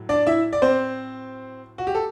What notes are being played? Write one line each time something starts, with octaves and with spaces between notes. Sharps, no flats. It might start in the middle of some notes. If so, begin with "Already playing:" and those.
Already playing: A2 F#3
D4 D5
E4 E5
D5
C4 C5
F#4
G4
A4